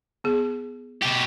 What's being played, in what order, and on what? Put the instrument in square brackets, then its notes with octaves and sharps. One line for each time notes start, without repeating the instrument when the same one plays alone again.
[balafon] B3 G#4
[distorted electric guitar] B2 G4